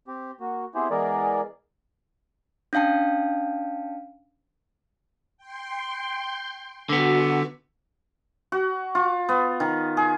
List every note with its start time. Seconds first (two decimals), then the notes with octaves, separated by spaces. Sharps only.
0.08 C4 G4
0.40 A#3 F#4
0.75 B3 C4 E4 G4 G#4 C5
0.90 E3 G#3 B3 G#4 A#4 D5
2.73 C#4 D4 F5 G5 A5
5.37 G5 C6
6.89 D3 B3 F#4
8.52 F#4
8.95 F4
9.29 B3
9.60 D#3
9.97 G#4